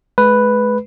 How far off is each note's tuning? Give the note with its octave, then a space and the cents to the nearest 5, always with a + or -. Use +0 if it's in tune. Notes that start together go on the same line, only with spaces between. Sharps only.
G#3 +40 B4 +0